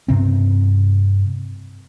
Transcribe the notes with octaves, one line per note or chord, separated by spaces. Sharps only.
G2 C3 C4